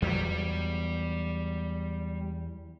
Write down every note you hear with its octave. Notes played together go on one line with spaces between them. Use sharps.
E2 F#3 G3